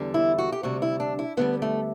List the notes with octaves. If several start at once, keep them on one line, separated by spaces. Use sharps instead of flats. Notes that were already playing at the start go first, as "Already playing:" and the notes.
Already playing: E2 D3 G3
E4
F#4
G4
D2 C3 G3 F#4
E4
D4
E4
D2 D3 G3 B3
A3